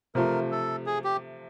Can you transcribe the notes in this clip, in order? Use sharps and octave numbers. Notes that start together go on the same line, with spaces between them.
C3 F3 A3 A#4
A4
G#4
G4